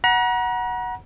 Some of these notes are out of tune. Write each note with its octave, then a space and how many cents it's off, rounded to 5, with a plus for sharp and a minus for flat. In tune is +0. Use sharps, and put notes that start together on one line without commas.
F#5 +0 A#5 +40